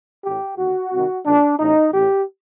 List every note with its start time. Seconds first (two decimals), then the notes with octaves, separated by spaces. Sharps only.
0.25 A1 A2 G4
0.58 D#2 D3 F#4
0.91 C2 C3 D#3
1.25 A#1 A#2 D4
1.58 A1 A2 D#4
1.92 A1 A2 G4